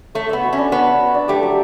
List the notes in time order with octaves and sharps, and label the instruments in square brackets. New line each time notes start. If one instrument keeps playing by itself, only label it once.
[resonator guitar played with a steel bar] A3 [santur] C#5
[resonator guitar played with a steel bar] B3 [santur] E5
[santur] F#4
[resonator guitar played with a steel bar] C#4
[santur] D4
[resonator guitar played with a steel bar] B3 [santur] C#5
[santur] E5
F#4
D4
[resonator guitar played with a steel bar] A3 [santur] G4
[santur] F#3